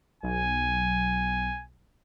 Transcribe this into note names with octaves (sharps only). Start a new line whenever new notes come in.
B1 G#5